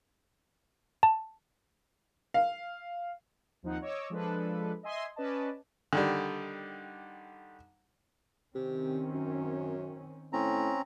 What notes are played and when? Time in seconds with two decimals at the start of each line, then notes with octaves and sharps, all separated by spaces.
1.03 A5
2.34 F5
3.63 D#2 F3 C4 D#4 F#5
3.82 C#5 D#5 D6 E6
4.10 F3 G#3 D4 A4 B4
4.83 D#5 E5 G#5 C6 D#6
5.16 C#4 B4 D5 D#5 A5
5.93 D3 D#3 G3
8.55 C3 D#3 C4 C#4
9.13 F#2
10.33 A2 C4 C#4 A#5